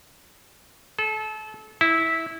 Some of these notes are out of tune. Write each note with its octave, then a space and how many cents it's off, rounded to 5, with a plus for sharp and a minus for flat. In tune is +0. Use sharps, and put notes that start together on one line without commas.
A4 -30
E4 -15